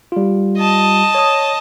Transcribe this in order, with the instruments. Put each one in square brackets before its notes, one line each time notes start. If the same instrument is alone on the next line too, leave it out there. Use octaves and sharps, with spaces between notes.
[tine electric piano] G3 F4
[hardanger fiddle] D#5 A5
[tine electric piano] C#5 D#6